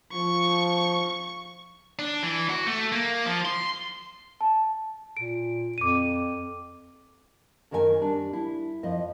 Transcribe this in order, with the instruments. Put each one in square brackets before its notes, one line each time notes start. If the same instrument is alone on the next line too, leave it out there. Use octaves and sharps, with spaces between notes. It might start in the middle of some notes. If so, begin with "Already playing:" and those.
[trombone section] F3 [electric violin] C#6
[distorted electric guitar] D4
E3
F#4
A3
A#3
F3
C6
[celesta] A5
[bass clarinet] A#2 [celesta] D7
[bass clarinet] F2 [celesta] D6 D#7
[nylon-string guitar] F#2 D#3 C#4 A#4 G5 G#5
G3 D4
E4
F2 F3 D#5